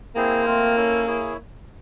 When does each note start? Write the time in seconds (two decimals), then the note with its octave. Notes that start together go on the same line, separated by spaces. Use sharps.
0.16 A#3 C4 E4 G#4 C5
0.46 A3 C4 F4 A#4
0.76 C#4 E4 A4 C#5
1.07 E4 G#4 C#5